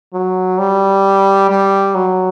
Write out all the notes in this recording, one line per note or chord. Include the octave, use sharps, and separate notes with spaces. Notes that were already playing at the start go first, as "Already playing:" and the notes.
F#3
G3
G3
F#3